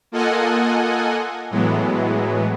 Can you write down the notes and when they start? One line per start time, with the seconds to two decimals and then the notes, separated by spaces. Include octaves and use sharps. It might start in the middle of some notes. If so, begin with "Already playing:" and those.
0.12 A#3 F4 A4 D#5 F#5 G#5
1.50 A2 E3 F#3 G#3 B3